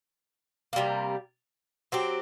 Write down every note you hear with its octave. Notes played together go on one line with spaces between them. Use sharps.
C3 G3 A#3
F#3 C4 G4